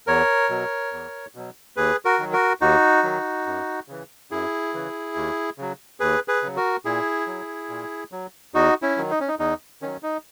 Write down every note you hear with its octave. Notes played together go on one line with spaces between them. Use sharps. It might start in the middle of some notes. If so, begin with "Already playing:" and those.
E2 A#4 C#5
B2 F#3
E2
B2 F#3
D#2 G#4 B4
F#4 A#4
D#3 F#3
F#4 A#4
D#2 D#4 F#4
D#3 F#3
F#2
C#3 E3
F#2 E4 G#4
C#3 E3
D#2
C#3 F#3
D#2 G#4 B4
G#4 B4
C#3 F#3
F#4 A#4
A#2 E4 G#4
F#3
A#2
F#3
E2 D#4 F#4
C#4 E4
D#3 F#3
D#4
C#4
D#4
E2 D#4
D#3 F#3 C#4
D#4